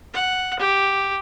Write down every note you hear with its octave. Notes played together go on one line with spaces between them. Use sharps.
F#5
G4